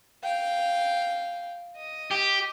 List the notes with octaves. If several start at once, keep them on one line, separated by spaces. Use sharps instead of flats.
F5 G5
D#5
G4